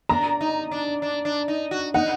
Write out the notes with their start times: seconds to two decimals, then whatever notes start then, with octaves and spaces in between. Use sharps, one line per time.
0.09 D4 A#5
0.41 D#4
0.71 D4
1.02 D4
1.25 D4
1.48 D#4
1.71 F#4
1.94 D#4 F#5